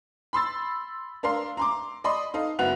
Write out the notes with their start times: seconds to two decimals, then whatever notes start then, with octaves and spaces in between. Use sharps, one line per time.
0.33 B5 C6 E6 A6
1.23 D4 A#4 F5 C6
1.57 A#5 C6 D6
2.04 D5 D#5 B5 C6 D#6
2.34 D#4 A4 D#5 F5
2.59 F#1 B3 F#4 F#6 F7